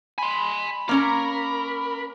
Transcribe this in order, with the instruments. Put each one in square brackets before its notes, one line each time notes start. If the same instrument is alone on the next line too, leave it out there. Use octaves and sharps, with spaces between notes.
[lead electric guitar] G#5 C6 [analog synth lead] B5
[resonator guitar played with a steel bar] A#3 C#4 A#5 [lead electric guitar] A#4